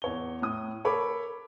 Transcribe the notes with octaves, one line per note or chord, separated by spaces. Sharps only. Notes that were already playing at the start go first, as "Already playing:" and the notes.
E2 C#5 G7
A2 D#6
A4 A#4 C#5 B5 D6